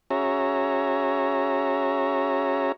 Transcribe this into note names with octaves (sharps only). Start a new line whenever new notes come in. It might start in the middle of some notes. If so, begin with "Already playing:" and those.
C#4 F#4 G#4 C#5 E5 A#5